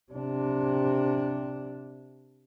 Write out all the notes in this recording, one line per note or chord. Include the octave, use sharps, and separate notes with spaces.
C3 D4